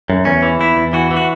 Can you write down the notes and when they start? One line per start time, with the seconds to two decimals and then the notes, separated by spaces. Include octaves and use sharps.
0.10 F#2
0.25 E2 C#4
0.43 E3
0.60 E2 E4
0.77 E2
0.93 E3 F#4
1.11 E3
1.17 F#4